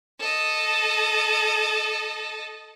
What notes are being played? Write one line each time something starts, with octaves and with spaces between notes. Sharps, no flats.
A4 D#5